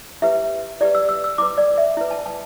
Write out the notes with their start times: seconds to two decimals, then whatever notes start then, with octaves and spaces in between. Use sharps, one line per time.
0.22 E4 G4 B4 E5
0.81 E4 G4 B4 D5
0.95 E6
1.09 E6
1.24 E6
1.38 E4 B4 D6
1.58 D5
1.78 E5
1.97 E4 B4
2.11 A5
2.26 A5